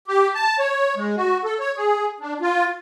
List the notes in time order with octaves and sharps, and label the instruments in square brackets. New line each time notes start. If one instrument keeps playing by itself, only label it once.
[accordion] G4
A5
C#5
G#3
F#4
A4
C#5
G#4
D4
F4